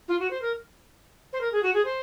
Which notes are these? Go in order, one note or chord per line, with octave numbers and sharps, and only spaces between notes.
F4
F#4
C5
A#4
C5
A#4
G#4
F#4
G#4
C5